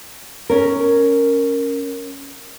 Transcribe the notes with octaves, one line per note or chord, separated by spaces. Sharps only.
C#4 A#4